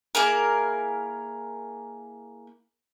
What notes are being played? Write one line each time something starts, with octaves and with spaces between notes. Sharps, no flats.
A#3 E4 G#4 A#4